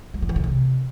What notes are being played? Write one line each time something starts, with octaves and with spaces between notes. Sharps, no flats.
G3
F3
E3
C#3
C3